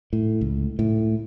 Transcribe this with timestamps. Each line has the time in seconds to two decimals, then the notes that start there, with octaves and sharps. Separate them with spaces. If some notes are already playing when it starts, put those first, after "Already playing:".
0.13 A2
0.41 C#2
0.79 A2